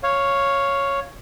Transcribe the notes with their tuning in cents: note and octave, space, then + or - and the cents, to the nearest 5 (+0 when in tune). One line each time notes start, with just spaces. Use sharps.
C#5 +0 F5 +0